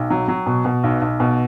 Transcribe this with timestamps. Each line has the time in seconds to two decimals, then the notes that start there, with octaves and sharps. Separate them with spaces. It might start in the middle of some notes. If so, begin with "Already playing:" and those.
Already playing: B1 G5
0.10 F#3
0.28 F#3
0.46 B2
0.65 B2
0.83 B1
1.01 B1
1.20 B2